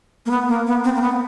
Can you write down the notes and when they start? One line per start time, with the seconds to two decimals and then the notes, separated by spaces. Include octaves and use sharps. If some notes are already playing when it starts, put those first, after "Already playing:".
0.26 A#3
0.31 B3
0.48 A#3
0.67 B3
0.84 C4
0.96 A#3
1.02 B3